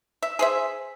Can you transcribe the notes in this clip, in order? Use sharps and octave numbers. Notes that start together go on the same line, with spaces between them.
E5
G#4 C5 E5